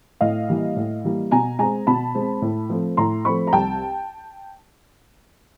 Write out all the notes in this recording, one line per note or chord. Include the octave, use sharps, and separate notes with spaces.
A2 D#5 F5
E3 G3 A#3
A2
E3 G3 A#3
B2 G#5 A#5
G#3 C4 G#5 A#5
B2 A5 B5
G#3 C4
A2
F3 A3 C4
A2 A#5 C6
F3 A3 C4 B5 C#6
A#5
C2 G5 A5